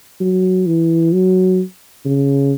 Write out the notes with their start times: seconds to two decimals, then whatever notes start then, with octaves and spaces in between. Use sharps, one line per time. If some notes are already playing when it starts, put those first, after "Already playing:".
0.20 F#3
0.67 E3
1.13 F#3
2.05 C#3